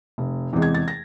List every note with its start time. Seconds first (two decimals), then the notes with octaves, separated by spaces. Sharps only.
0.18 F1
0.53 E2 C3 E3 G#3
0.62 G#6
0.74 A6
0.88 A#6